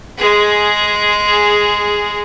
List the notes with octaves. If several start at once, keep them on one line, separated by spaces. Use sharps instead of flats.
G#3 G#4